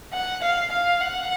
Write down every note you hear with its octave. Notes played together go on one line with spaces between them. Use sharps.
F#5
F5
F5
F#5